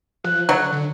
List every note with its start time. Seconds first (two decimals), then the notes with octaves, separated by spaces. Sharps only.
0.24 F3 F#6
0.49 D3 F#3
0.72 D3